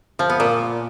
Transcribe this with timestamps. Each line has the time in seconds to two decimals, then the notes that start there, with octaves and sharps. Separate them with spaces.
0.19 F3
0.29 B3
0.40 A#2